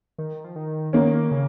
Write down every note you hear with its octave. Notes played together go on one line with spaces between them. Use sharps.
D#3
F3
D#3
D#3 A#3 C#4
C#3